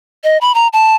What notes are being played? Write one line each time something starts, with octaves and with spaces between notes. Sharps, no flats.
D#5
B5
A#5
A5